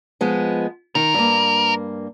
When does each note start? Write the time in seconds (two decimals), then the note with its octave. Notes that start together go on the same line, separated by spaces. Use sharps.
0.21 F3 G#3 B3
0.95 D#3 A#4
1.14 G2 A#3